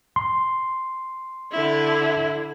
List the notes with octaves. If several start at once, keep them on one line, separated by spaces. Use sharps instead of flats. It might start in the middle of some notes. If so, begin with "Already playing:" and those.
C6
D3 E4